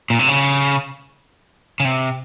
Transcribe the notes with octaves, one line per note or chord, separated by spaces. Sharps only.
A#2
C3
C#3
C#3
C3